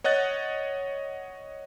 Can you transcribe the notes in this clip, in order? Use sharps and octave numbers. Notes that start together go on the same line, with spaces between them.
C#5 D#5 F#5 F#6 A6